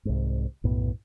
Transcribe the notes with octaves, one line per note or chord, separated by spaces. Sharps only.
C2 G#2
B1 F#2 A2 B3